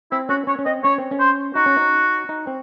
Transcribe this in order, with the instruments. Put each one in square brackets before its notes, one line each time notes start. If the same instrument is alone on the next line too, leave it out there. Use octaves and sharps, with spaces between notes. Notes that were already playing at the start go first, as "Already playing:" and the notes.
[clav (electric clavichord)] C4 [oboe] E4
[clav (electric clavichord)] C#4 [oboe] F#4
[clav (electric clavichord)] C#4 [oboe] C#5
[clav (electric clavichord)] C#4
[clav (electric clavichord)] C4 [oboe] D#5
[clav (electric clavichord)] C#4 [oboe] C#5
[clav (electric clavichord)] C4
C#4
[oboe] C5
[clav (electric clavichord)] D#4 [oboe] F#4
[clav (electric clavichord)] C#4
D#4
D#4
C4